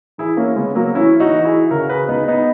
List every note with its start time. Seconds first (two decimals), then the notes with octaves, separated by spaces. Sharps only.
0.18 E3 E4 G#4
0.37 A#3 C#4
0.56 C#3 G#3 B3
0.75 F#3 A#3
0.95 E3 C#4 E4
1.20 D#4 F#4
1.32 E3
1.45 E4 G#4
1.70 C#3 F#4 A#4
1.89 G#4 B4
2.08 C#2 B3 D#4
2.28 B3 D#4